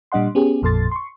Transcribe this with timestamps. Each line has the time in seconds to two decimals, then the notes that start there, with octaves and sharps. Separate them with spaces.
0.12 A#2 G3 D4 D#5 F#5 C6
0.35 B3 C#4 G4 G#4
0.62 A1 F2 A#2 A4 C6 A6
0.91 C6 C#6